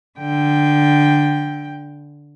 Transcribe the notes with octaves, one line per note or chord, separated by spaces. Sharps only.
D3 G5